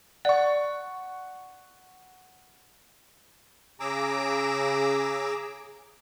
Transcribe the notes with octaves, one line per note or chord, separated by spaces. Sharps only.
D5 F#5 C#6
C#3 G#4 A#5 D6 E6